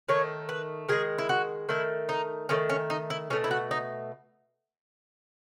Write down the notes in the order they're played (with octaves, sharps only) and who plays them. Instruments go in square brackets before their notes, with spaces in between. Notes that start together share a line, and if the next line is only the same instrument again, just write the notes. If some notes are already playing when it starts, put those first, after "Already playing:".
[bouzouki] D#3 A3 C#5
B4
D#3 G#3 G#4
E4
F#4
D#3 A3 E4
D#4
D#3 A3 C#4
C#4
D#4
E4
B2 A3 C#4
E4
F#4
D#4